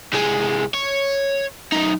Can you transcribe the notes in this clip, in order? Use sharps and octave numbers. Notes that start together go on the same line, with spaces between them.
C2 G#3
C#5
F#2 D#4